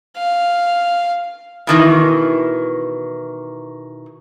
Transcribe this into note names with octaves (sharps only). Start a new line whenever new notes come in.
F5
B2 D#3 E3